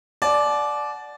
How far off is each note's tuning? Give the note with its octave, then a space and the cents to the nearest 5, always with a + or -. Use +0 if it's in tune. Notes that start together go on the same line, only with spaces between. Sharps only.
D5 +0 F#5 +0 A5 -40